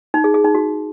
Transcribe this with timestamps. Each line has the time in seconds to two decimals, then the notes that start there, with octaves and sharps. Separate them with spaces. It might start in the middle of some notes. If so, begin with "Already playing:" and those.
0.14 D#4
0.24 G#4
0.34 G#4
0.44 D#4
0.55 F#4